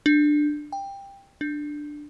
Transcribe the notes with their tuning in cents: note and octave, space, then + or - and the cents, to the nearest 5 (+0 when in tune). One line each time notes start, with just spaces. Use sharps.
D4 +15
G5 +15
D4 +10